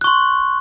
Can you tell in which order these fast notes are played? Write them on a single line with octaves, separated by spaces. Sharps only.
F#6 C#6 C6